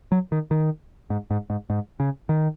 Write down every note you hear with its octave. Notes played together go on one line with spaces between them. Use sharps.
F#3
D#3
D#3
G#2
G#2
G#2
G#2
C#3
D#3